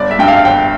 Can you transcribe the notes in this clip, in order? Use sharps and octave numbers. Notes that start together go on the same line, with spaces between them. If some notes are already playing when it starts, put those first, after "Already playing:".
Already playing: G1 D5
E5
G2 G5
F5
G1 G5